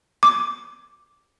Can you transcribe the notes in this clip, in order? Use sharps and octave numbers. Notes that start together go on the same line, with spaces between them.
D6